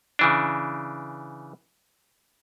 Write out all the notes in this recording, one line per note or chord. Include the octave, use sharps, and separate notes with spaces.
C#3 E3 D4